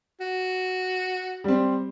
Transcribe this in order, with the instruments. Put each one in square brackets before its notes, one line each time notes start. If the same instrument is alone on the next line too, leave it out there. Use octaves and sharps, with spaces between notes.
[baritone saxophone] F#4
[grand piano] G3 C4